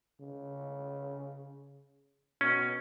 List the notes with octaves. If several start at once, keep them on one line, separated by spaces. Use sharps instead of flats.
C#3
B2 C#4